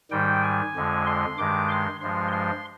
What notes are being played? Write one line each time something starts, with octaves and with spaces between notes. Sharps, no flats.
G#2 D#3 G3 G5
G#5
F2 D3 G#3
C6
G2 D#3 G#3 D6
C6
G2 F3 G#3 C6
C6